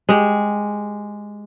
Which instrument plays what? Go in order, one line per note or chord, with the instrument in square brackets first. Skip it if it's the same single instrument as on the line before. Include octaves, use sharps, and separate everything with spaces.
[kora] G#3 G4